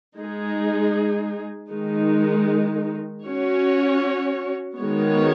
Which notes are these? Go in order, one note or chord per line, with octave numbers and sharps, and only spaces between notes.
G#3 D#4 G#4
D#3 G#3 D#4
C#4 F#4 C#5
D#3 G#3 B3 F#4 C#5